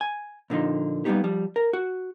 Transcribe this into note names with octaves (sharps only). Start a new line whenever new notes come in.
G#5
A#2 D3 F3 D#4
G3 A#3 B3 D4 D#4 G4
F3 G3
A#4
F#4